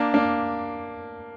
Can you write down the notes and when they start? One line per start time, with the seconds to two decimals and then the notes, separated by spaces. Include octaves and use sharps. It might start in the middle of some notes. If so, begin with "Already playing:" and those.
Already playing: A#3 D4
0.14 A#3 D4